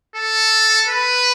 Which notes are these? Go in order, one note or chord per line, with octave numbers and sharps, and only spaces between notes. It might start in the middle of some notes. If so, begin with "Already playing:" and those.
A4
B4